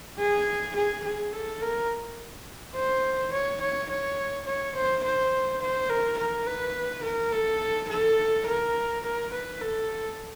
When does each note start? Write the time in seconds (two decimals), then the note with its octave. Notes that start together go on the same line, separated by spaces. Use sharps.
0.19 G#4
0.76 G#4
1.04 G#4
1.33 A4
1.61 A#4
2.76 C5
3.33 C#5
3.61 C#5
3.90 C#5
4.47 C#5
4.76 C5
5.04 C5
5.61 C5
5.90 A#4
6.18 A#4
6.47 B4
7.04 A#4
7.32 A4
7.89 A4
8.46 A#4
9.04 A#4
9.33 B4
9.61 A4